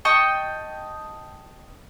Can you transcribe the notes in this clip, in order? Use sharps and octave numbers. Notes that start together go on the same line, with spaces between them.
D#5 G5 A5 C#6